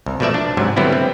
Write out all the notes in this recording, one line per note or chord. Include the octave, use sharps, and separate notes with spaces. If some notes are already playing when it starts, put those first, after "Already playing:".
C2
B2 F3 A3 D5 E5
D4
G#2 C3 F#3
D3 F#3 G3 B3 C4 E4
C4